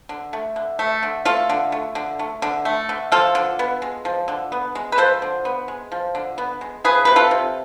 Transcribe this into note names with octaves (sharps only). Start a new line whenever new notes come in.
D3
A3
D3
A3
D3
A3 F4 A4
D3
A3
D3
A3
D3
A3
D3
F3 F4 A4
D3
B3
G#3
F3
D3
B3
G#3
B4
F3 A4 C5
D3
B3
G#3
F3
D3
B3
G#3
F3 G#4 B4
C3 B4
F4 A4
C3